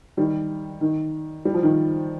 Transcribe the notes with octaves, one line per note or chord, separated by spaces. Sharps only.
D#3 G3
D#3
G3
F3
D#3